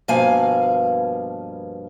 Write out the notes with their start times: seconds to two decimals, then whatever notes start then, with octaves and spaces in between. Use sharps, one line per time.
0.08 G2 B2 F3 A#3 F5 G#5